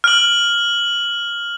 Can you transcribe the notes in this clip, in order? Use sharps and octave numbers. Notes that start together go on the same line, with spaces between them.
F6 F#7